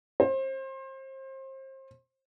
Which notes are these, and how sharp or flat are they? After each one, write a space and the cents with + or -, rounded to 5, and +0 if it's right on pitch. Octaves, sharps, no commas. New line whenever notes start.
C5 +30